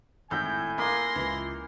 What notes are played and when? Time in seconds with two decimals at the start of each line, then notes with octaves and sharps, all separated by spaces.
0.31 G#1 A2 E4 G5 G#5 G6 A#6
0.78 A#3 C6 D6 D#6 G#6 A#6
1.16 C#2 C#3 E3 F4